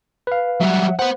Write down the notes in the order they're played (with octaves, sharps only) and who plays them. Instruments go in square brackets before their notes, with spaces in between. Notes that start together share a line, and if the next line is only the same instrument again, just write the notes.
[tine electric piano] B4 F5
[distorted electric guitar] F#3 G3 [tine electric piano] E5 F#5
[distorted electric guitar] B4 F#5 [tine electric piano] C5